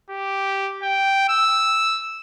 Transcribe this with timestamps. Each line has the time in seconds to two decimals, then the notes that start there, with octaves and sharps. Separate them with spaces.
0.10 G4
0.82 G5
1.29 E6